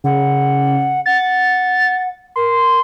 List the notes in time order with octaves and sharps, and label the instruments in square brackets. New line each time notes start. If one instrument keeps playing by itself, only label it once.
[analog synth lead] C#3 [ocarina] F#5
[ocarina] F#5 [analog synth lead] A6
[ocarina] A#4 [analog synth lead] C6